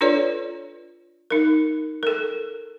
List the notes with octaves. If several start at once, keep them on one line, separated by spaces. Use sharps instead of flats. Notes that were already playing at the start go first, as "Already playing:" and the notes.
D4 F4 A4 B4 C#5 D5
D#4 A#4
A4 A#4